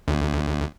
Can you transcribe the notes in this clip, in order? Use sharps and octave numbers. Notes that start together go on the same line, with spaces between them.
D2